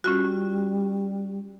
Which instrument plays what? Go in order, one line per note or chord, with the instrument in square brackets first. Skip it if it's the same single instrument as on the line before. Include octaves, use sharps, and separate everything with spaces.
[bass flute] G3 [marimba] C#4 F4 F#4